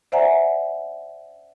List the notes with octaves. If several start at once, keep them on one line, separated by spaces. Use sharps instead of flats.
C5 D5 E5 F#5 G#5 A#5